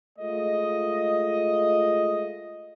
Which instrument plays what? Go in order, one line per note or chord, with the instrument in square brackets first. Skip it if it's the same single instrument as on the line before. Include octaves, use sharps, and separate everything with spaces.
[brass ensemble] G#3 A3 F4 D#5